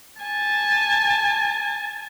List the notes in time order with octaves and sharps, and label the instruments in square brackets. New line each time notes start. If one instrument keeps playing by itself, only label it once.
[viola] G#5 A5